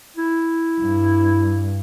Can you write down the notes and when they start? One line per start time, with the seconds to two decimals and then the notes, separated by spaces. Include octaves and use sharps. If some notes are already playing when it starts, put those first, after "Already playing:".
0.17 E4
0.81 G2